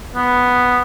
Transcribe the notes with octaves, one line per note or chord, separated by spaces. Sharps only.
B3